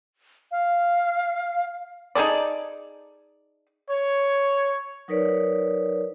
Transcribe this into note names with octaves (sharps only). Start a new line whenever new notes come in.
F5
D#4 G#4 A4 D5
C#5
F#3 D#4 A#4 B4 C#5 D5